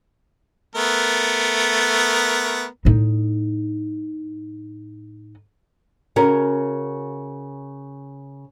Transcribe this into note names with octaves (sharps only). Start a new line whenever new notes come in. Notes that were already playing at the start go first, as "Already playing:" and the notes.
A3 B3 A#4
A2 D#4
C#3 C#4 F#4 A#4